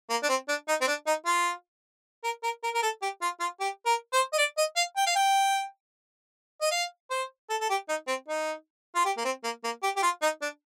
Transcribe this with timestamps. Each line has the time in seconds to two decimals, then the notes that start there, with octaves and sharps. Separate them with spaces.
0.10 A#3
0.23 D4
0.29 C4
0.49 D4
0.68 D#4
0.81 C4
0.88 D4
1.07 D#4
1.26 F4
2.24 A#4
2.43 A#4
2.63 A#4
2.74 A#4
2.83 A4
3.02 G4
3.22 F4
3.40 F4
3.61 G4
3.86 A#4
4.13 C5
4.33 D#5
4.38 D5
4.58 D#5
4.76 F5
4.97 G5
5.07 F5
5.16 G5
6.62 D#5
6.71 F5
7.11 C5
7.50 A4
7.61 A4
7.70 G4
7.89 D#4
8.08 C4
8.28 D#4
8.95 F4
9.05 G4
9.17 A#3
9.25 C4
9.44 A#3
9.64 A#3
9.83 G4
9.97 G4
10.03 F4
10.22 D#4
10.42 D4